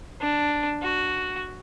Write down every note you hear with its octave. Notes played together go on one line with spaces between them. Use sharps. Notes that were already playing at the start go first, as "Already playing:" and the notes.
D4
F#4